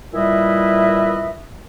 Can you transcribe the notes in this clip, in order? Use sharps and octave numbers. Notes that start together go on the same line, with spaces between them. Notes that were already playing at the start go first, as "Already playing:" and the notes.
A#2 G3 E4 B4 D#5 E5